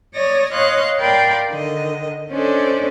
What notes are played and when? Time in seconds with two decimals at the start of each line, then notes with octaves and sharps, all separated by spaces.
0.14 C#5 D5 D#6 A#6
0.51 C#5 D#5 F5 C6 F#6
0.99 A#4 D5 F5 G5 B5 C6
1.49 D3 D#3 D#5
2.30 C#4 D4 A4 C5 D5 D#5